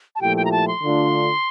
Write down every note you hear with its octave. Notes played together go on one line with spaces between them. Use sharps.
A5
A#2 F3 A3 E4 G4 G5
G5
A#5
A5
C6
D3 A3 D4 F4